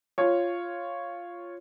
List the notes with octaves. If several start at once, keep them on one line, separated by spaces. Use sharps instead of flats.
F4 C#5